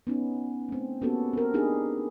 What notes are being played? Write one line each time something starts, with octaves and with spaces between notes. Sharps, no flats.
B3 C#4 D#4
A3 C4
A#3 B3 C#4 F#4 G4 A4
C4 A#4
C4 D4 D#4 G4 G#4 B4